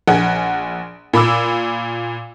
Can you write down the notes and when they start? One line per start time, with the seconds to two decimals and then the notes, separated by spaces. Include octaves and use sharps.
0.08 A#1 G#4 F#5
1.13 A#2 B5 D6 E6